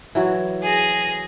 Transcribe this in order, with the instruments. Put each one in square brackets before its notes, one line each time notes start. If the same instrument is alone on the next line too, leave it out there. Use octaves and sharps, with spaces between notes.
[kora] E3 F#3 F#4
[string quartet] G#4 A#6